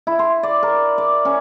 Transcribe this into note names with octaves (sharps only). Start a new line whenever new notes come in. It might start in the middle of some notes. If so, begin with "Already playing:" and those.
E4
C6
D5
A#4
D5
C#4